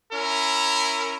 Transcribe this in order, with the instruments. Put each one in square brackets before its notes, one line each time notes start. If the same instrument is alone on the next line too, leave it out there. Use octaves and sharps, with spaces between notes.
[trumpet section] C#4 E4 A#4